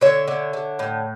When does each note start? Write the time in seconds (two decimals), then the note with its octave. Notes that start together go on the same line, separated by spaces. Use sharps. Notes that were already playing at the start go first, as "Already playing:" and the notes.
0.01 D3 C#5 E5
0.28 D3
0.53 D3
0.79 A2